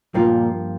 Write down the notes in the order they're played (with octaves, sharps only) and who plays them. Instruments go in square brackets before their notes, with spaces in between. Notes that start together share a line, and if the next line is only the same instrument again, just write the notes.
[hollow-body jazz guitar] G2 F3 A#3 F4 [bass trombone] A#2